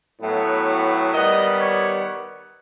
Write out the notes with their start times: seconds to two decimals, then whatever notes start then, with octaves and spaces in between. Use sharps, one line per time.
0.22 A2 F#3 B3
1.12 D#3 G3 B3 D#5
1.59 C#5